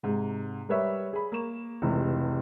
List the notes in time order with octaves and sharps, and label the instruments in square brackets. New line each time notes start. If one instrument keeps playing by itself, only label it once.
[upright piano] G#2 C3
G3 A#4 B4 C#5 E5
G#4 B5
A#3 C#6 E7
F1 C#2 C3 E3